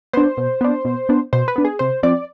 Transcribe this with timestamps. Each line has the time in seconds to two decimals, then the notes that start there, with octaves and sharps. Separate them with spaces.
0.13 B3 D4 C5
0.37 B2
0.61 B3 D4
0.85 B2
1.09 B3 D4
1.33 B2 C5
1.48 B4
1.56 B3 D4
1.65 G#4
1.79 C3 C5
2.03 F3 C4 D5